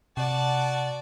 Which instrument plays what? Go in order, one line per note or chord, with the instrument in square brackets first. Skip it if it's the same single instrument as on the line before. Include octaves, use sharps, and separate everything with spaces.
[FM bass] C3 [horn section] F#4 D5 [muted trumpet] F#5 [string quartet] A5